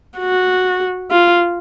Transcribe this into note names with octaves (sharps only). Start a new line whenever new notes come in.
F#4
F4